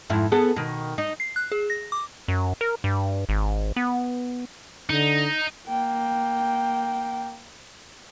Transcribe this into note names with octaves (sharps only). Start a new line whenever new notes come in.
F2 G#2 E4
B3 G#4 A4
B2 D#3
D#4
C7
F#6
G#4
A#6
D6
F#2
A#4
G2
G#1
B3
D3 D#4
A#3 G5